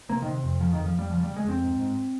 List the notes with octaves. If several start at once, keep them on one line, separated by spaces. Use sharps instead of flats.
C3 A#3
D#3
C3
F2
C#3 F3
D#3
F2
F3
F2 G3
C#3 F3
G3
C#3
G#3
F2 C4
G#2
G#2